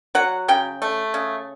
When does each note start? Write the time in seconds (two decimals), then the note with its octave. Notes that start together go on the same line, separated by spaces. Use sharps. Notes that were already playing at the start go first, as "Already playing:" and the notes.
0.15 F#3 F#5
0.48 C#3 G5
0.82 A3
1.14 C#3